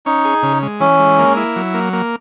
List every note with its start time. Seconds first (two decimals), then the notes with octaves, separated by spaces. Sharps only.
0.06 C#4 D#4
0.25 G#4
0.43 C#3
0.63 G#3
0.80 E3 C#4
0.99 G#3
1.19 A#3
1.37 E4
1.56 F#3
1.74 A#3
1.93 A#3